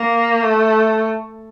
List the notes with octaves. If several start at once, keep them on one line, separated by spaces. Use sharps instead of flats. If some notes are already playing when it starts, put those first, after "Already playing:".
Already playing: A#3
A3